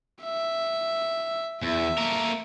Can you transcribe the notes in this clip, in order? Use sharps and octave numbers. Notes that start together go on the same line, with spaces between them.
E5
E2 E5
A3 A#3 A#4